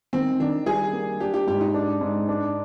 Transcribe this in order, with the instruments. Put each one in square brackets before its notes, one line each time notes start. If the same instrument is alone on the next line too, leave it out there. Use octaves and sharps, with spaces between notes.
[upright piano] D#3 [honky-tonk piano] C4
[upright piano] D#3 [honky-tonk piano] D4
[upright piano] G3 [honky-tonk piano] G#4
[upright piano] A#3
[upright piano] D4 [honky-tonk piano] G4
[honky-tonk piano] G4
[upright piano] G#2 [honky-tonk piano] G4
[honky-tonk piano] D#4
[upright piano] D4
G#2
D4